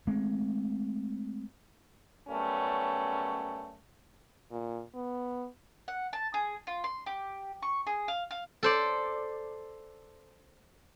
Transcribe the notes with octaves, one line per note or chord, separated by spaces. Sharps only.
G#3 A3 C4
F#2 G3 A3 B3 C#4
A#2
B3
F#5
A5
G#4
F4
C6
G4
C#6
G#4
F5
F5
A4 C5 D5